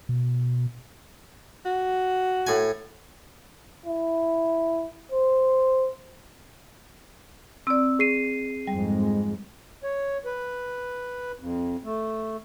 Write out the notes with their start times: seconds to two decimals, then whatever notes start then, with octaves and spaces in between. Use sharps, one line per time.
0.09 B2
1.65 F#4
2.47 A2 G#5
3.86 E4
5.12 C5
7.67 C4 D5 E6
7.99 G#4 C7 D#7
8.67 F2 G#2 G3 G#3
9.83 C#5
10.25 B4
11.39 F2
11.84 A3